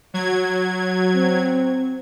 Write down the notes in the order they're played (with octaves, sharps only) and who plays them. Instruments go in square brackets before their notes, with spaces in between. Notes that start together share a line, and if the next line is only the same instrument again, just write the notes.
[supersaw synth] F#3 G#6
[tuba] C4